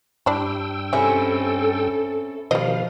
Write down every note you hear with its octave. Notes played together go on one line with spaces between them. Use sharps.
G2 G3 D4 E4 G5 E6
G3 G#3 C4 C#4 E4 A4
B2 D#3 F3 G3 D#5 F5